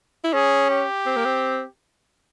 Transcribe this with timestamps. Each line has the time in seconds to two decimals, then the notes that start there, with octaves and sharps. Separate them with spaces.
0.24 E4
0.33 C#4 G#4
0.71 G4
1.06 C4
1.16 A#3
1.25 C4